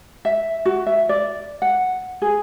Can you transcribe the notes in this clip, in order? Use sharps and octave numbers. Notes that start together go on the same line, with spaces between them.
E5
F#4
E5
D5
F#5
G#4